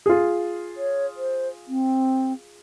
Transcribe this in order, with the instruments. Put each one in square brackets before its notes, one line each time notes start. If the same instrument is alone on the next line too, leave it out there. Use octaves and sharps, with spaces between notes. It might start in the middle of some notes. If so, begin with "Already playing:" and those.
[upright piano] F4 G#4
[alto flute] C#5
C5
C4